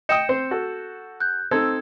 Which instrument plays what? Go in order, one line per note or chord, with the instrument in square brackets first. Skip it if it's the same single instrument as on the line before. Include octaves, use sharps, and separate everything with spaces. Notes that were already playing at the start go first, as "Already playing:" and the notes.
[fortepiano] D#5 G5 D#6 [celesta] G6 C#7 E7
[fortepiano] C4 C5
F#4 A4
[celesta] F#6 G6
[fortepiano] C4 D#4 A4 [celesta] E6 G#6